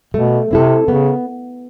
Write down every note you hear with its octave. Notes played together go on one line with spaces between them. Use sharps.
B2 A3
C3 C4 E4 A4
C#3 B3